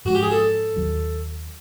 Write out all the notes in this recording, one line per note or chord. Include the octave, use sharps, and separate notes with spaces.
G#2 F3 G#3 C#4 F#4
G4
G#4
A4
D#2 D#3 F#3